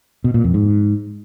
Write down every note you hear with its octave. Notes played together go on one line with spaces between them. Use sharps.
B2
A#2
F2
G#2